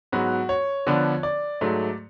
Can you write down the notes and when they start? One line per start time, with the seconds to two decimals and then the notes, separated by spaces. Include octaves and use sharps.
0.12 G#2 F#3 B3 F#4
0.49 C#5
0.87 D3 F3 B3 D4
1.23 D5
1.61 G#2 F#3 A3